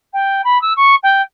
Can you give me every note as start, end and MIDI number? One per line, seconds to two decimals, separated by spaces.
0.13 0.41 79
0.44 0.60 83
0.61 0.73 88
0.76 0.95 85
1.03 1.21 79